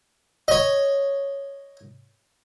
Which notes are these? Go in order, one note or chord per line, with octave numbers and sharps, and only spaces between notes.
C#5 D#5